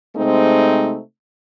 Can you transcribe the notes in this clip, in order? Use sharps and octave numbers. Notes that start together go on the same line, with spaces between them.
C3 G#3 A3 C4 D#4